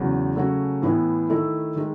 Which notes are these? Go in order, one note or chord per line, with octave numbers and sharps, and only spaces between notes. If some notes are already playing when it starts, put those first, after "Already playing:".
Already playing: E2 C#3 F#3
C#3 F#3 A3 C#4 F#4
A2 E3 B3 E4
D#3 A3 E4 A4
D#3 G#3